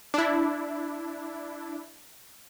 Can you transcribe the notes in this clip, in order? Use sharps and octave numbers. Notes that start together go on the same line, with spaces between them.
D4 E4